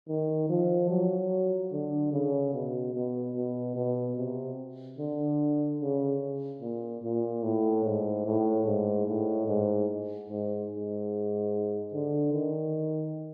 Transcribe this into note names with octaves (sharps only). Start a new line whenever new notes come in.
D#3
F3
F#3
D3
C#3
B2
B2
B2
B2
C3
D3
C#3
A#2
A#2
A2
G#2
A2
G#2
A2
G#2
G#2
G#2
D3
D#3